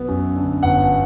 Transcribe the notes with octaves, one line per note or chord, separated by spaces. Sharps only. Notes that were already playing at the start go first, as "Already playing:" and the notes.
Already playing: B1 B3
F#2
D3
G1 F#5